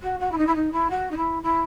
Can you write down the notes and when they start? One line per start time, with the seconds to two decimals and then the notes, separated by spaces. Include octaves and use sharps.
0.02 F#4
0.19 F#4
0.31 E4
0.37 D#4
0.47 E4
0.55 D#4
0.72 E4
0.90 F#4
1.11 D#4
1.16 E4
1.42 E4